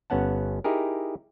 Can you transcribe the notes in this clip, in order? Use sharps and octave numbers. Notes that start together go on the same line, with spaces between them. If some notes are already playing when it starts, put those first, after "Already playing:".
G1 B3 C#4 F#5 A5
D#4 E4 G4 G#4 A#4